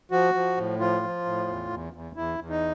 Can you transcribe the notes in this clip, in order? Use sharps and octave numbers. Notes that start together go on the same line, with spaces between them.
F3 F#4
F3
A2
F3 F4
F3
A2
E2
E2
E2
E2 E4
E2
D#4